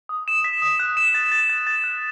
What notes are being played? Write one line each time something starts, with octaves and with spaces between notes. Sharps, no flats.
D#6
E7
B6
D#6
F#6
E7
A6
A6
A6
A6
F#6